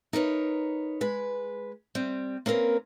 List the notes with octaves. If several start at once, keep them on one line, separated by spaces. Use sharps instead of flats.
D#4 A#4 B4 C#5
G#3 B4
G3 C4
A#3 C4 C#4 A#4 B4